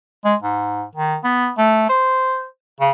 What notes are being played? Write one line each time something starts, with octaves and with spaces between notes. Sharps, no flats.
G#3
G#2
D#3
B3
A3
C5
C#3